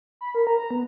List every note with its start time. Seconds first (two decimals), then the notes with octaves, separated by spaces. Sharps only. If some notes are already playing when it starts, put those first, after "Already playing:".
0.21 B5
0.35 A#4
0.47 A#5
0.71 B3